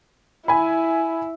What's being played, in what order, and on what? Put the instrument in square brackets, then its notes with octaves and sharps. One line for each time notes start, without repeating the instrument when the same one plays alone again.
[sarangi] E4 [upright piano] G#5 B5